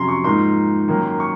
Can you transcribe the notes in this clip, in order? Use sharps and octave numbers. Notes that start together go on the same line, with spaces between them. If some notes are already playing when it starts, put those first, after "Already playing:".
Already playing: F2 C3 F#3 C#4 A#5 C6
C#6
G#2 F3 A#3 D#4 C6
F#2 D#3 A#3
C#6